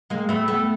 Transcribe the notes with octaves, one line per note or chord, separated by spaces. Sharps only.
G#3 A#3
A3 B3
A3 B3